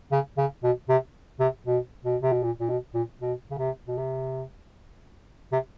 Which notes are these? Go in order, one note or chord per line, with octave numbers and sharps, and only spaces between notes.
C#3
C#3
B2
C3
C3
B2
B2
C3
B2
A#2
A#2
B2
A#2
B2
C#3
C3
B2
C3
C3